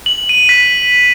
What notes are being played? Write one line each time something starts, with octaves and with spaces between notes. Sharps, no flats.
F#7
D#7
B6